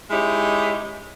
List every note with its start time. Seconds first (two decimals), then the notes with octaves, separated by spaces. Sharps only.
0.11 G#3 C#4 D#4 E4 G4